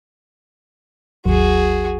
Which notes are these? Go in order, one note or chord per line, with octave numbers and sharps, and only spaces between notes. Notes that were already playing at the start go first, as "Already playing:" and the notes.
G#1 D#2 F#3 F#4 G#4